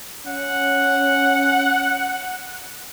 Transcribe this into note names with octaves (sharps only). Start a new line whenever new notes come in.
C#4 F#5